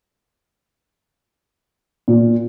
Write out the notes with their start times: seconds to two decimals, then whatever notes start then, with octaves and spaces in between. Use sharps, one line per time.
2.08 A#2